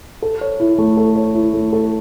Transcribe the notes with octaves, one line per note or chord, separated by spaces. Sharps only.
A4
C#5
E4
A3
A4
C#5
E4
A3
A4